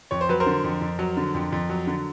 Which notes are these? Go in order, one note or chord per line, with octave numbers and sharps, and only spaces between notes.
F2 C#5
C5
F#3 B4
A#4 C5
D3
F2
F2
F#3
D3
F2
F2
F#3
D3